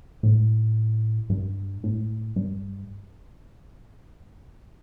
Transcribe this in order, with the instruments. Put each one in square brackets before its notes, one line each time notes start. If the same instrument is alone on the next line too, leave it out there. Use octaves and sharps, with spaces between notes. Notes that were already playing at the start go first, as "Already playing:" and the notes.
[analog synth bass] A2
G2
A2
G2